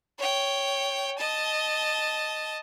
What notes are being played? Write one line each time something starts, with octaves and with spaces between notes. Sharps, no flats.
C#5 G5
D#5 A5